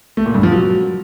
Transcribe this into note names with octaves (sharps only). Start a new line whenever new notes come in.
A3
A#2
G2
F3
F#3